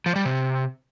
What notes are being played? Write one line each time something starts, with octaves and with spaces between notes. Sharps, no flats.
F3
G3
C3